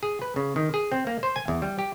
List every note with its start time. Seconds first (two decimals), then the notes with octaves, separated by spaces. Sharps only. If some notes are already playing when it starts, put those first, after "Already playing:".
0.03 G#4
0.22 B4
0.36 C#3
0.56 D#3
0.74 G#4
0.92 C4
1.07 A#3
1.23 C5
1.36 G#5
1.48 E2
1.62 G3
1.79 G4